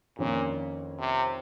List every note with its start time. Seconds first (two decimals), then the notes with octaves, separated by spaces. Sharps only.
0.18 F2 A#2 D#3 A#3 C#4
0.99 C3